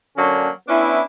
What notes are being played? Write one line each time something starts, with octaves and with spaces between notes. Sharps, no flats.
D3 F#3 A#3 C#4 D4
B3 C#4 D4 E4